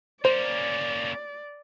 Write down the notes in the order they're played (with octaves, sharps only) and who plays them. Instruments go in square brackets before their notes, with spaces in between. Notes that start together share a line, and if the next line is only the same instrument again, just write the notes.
[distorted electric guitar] A#3 C#4 [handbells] C5 [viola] D5